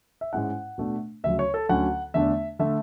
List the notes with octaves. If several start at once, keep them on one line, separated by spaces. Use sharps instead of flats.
E5
G#2 G#3 C#4 E4 F#5
B2 A3 D4
D2 C#3 F#3 E5
C#5
A4
D2 D3 F#3 C#4 F#5
E2 D3 A3 D4 E5
D3 A3 E5